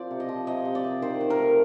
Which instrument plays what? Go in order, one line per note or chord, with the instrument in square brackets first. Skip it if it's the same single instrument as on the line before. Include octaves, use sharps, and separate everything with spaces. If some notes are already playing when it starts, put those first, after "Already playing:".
Already playing: [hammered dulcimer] F3 C4 D5
C3
D#5
F3
C3 D#5
C3
D5
C3
D#3 C5
D#3
A#4
A3